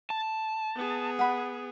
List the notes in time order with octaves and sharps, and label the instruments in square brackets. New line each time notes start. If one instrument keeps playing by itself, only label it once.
[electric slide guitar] A5
[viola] B3 G#4
[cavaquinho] F#5 B5